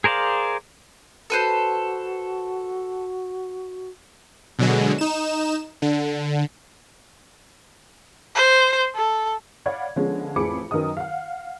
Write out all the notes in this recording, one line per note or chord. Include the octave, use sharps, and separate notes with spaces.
G#4 A#4 C5 D5 F5
F#4 A4 B4 C5
B2 D3 F#3 G#3
D#4 E7
D3
C5
A4
C#5 D5 F5 F#5 B5 G#6
D3 F3 G#3 B3 C#4
A1 F2 G#4 B5 D6 C#7
F#2 D#3 A#4 B4 D#5 D#6
F5 F#5